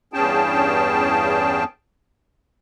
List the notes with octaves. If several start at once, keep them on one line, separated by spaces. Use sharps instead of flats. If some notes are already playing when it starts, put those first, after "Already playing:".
E2 G2 C#4 G#4 G5 A5